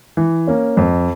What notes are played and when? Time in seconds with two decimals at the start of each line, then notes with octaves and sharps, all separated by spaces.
0.17 E3
0.47 A#3 C#4
0.77 F2